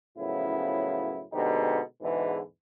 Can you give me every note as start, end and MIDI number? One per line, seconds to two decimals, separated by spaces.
0.18 1.21 42
0.18 1.21 45
0.18 1.21 49
0.18 1.21 53
0.18 1.21 59
0.18 1.21 64
1.33 1.80 47
1.33 1.80 50
1.33 1.80 56
1.33 1.80 60
1.33 1.80 63
1.33 1.80 67
2.02 2.40 40
2.02 2.40 44
2.02 2.40 47
2.02 2.40 50
2.02 2.40 52